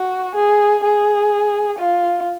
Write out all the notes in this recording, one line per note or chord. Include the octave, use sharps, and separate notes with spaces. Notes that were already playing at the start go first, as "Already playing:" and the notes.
Already playing: F#4
G#4
G#4
F4